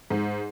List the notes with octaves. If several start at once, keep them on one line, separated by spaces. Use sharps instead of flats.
G#2